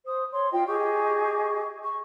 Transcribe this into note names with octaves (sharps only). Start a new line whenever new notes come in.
C5 D#6
C#5 C6
F4 D#5 G5
G4 G#4 D#5 C#6
C#6